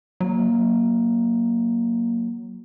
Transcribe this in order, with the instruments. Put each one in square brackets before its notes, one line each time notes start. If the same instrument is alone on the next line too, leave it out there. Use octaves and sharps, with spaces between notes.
[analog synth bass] F#3 [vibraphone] A#3